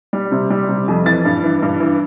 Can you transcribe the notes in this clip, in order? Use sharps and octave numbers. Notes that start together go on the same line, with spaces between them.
G3
C3
G3
C3
F2
E3 A6
G2
E3
G2
E3